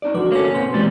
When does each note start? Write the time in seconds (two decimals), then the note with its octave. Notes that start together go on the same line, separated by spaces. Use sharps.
0.02 C#4 D#4 D5
0.14 G2 D3 F3 F#4 B4 D6
0.32 A#3 C#4 A4 A#4 C#5
0.54 B1 C4 A#4 B4 C6
0.74 A#2 E3 G3 G#3 A6